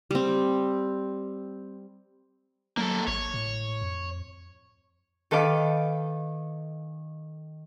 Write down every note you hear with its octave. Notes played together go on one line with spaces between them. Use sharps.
G3 C4
F#3 A#3 A4
G#1 C#5
A2
F2
D#3 A4 B4 F5 D6